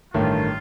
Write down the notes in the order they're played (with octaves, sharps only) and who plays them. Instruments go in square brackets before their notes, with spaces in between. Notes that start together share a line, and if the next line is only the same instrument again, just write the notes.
[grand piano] A1 G2 D#3 A3 [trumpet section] F4